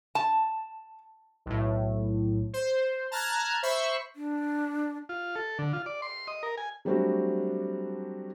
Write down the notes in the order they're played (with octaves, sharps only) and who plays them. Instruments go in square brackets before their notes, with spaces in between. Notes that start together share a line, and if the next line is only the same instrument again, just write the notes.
[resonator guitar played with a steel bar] A5
[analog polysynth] B1 A2
C5
A5 A#5 F6 F#6 G#6
C5 E5 B5 C#6
[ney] D4
[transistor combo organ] F4
A4
D3
F4
D5
C6
D#5
A#4
G#5
[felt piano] F#3 G3 A3 C4 D4 F#4